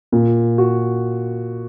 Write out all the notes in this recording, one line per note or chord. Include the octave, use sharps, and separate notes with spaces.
A#2
F#4